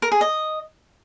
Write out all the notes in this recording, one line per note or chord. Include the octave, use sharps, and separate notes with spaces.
A#4
G#4
D#5